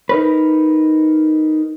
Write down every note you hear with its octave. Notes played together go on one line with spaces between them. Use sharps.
D#4 A#4 B4